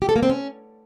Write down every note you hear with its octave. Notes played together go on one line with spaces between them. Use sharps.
G4
A4
A#3
C4
C#4